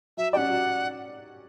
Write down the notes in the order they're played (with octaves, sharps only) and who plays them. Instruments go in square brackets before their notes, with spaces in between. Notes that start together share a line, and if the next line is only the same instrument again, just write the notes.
[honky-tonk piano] F#3 [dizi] E5
[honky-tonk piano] C#4 G4 D5 [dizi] F#5 G5
[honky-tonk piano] F#3